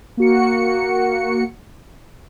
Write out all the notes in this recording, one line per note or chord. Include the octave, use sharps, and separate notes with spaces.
A#3 F#4 C#7